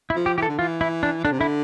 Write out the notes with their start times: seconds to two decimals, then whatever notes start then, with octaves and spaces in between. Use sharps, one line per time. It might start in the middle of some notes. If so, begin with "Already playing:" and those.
0.10 E4
0.16 F3
0.26 G4
0.37 E3 G4
0.42 A4
0.48 D3
0.59 E3 F4
0.81 E4
1.03 D4
1.24 D3 D4
1.32 C3
1.39 D3 E4